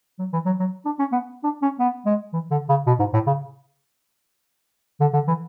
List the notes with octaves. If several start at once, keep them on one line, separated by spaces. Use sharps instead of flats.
F#3
E3
F#3
F#3
D4
C#4
B3
D4
C#4
B3
G#3
E3
D3
C#3
B2
G#2
A2
C#3
D3
D3
E3